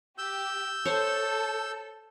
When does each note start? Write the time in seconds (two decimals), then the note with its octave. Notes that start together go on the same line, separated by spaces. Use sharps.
0.18 G4 E6 G6
0.86 A4 C5 C#5